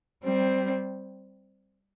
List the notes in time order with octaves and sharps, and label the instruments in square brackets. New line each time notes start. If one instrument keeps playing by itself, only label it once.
[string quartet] G3 C4